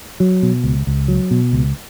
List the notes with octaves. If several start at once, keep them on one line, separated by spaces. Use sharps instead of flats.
F#3
B2
C#2
C#2
F#3
B2
C#2